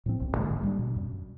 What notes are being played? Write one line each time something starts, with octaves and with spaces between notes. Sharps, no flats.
A2 F3 C4
F1 C2 F2 C4
G#2 D3 G#3 A#3
G3 C#4 D4
B2
F#2